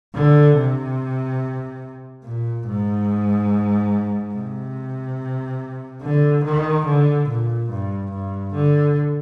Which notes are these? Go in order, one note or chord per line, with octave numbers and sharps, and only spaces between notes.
D3
C3
A#2
G#2
C3
D3
D#3
D3
A#2
G2
G2
D3